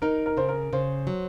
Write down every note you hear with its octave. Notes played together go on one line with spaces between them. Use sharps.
D#4 A#4
A#4
C#3 C5
A#4
C#3 C5
F#3